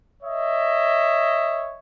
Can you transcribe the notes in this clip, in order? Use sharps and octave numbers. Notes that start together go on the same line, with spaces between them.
C#5 D#5 E5